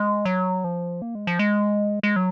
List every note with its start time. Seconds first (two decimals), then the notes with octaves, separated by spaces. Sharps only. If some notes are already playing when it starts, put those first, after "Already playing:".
Already playing: G#3
0.25 F#3
0.64 F3
1.02 A#3
1.15 G#3
1.27 F3
1.39 G#3
2.03 G#3
2.16 F#3